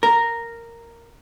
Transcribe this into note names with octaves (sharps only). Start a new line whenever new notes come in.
A#4